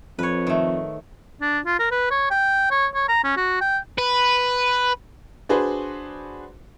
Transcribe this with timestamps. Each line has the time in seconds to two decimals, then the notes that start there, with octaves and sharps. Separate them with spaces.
0.19 F2 B4 C#5
0.47 D#3 A3
1.42 D4
1.66 F4
1.79 A#4
1.91 B4
2.11 C#5
2.31 G5
2.71 C#5
2.95 C#5
3.09 A#5
3.24 C#4
3.37 F#4
3.61 G5
3.98 B4
5.49 D4 F#4 G#4 B4 C5